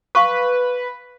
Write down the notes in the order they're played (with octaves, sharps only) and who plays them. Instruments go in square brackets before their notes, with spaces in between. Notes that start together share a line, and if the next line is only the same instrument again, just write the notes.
[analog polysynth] B4 [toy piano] F5 C#6 D6